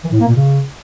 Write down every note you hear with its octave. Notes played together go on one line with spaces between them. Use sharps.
E3
A2
A#3
A#2
C#3